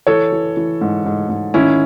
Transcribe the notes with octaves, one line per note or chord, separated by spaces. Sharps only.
E3 A4 C#5
E3
E3
G#2
G#2
G#2
D#3 C#4 E4